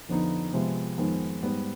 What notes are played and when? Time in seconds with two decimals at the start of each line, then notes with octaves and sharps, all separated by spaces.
0.08 F2 D3 F3 B3 D#4
0.53 C3 F3 G#3 B3
0.98 F2 D#3 G#3 B3
1.43 G#2 G3 B3